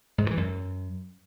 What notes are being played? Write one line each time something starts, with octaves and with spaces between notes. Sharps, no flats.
G#2
G2
E3
F#2